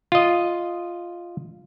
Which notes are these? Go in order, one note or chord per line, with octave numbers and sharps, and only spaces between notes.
F4 D#5